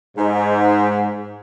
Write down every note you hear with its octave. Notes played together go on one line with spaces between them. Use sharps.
G#2